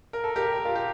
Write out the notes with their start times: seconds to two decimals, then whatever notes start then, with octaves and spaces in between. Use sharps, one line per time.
0.13 A#4
0.24 A4
0.36 G4 A#4
0.65 F4
0.75 G4